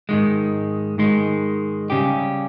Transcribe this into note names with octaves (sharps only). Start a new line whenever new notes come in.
G#2 D#3 G#3
G#2 D#3 G#3
C#3 G3 C#4 G4